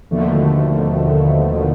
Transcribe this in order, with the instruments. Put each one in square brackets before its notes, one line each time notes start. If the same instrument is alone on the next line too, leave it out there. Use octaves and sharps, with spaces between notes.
[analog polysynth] D#2 B2 D3 D#3 F3 A3